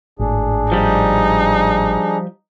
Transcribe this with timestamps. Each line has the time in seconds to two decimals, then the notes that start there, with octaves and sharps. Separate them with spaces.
0.19 G#1 A2 D4 G#4
0.72 F3 G3 D#4